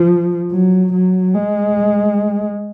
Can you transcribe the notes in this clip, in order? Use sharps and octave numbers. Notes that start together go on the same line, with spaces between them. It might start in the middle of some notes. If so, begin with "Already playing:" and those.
Already playing: F3
F#3
F#3
G#3